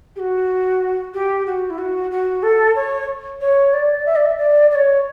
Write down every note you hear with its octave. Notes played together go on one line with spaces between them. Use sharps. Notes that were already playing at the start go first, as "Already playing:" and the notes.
G4
F#4
G4
F#4
E4
F#4
F#4
A4
C#5
C#5
D5
E5
D5
E5
D5
D5
C#5